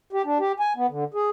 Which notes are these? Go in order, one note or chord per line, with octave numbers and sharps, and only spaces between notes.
G4
D4
G4
G#5
B3
D3
G#4